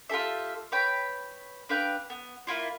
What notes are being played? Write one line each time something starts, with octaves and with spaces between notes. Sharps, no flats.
F4 G4 A4 E5
B4 C#5 G5 B5
D4 B4 F5 G5
B3
A#3 E4 F4